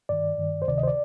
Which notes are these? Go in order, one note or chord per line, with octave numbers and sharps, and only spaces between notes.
G2 D#3 D5
G2 D#3
C5
D2 C3 D#3 D5
D#5
C5
D5